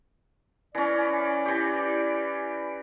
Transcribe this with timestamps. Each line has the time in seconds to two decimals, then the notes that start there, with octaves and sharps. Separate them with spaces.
0.75 E3 C#4 D5
1.46 E3 G4